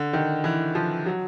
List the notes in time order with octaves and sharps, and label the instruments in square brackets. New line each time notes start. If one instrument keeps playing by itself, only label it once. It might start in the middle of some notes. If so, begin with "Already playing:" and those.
Already playing: [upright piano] D3
D#3
E3
F3
F#3